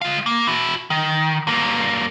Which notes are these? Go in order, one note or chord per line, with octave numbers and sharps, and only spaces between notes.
G#3 F5
A#3
E4 F#4
D#3
G2 A#3